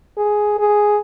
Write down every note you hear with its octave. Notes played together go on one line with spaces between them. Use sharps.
G#4
G#4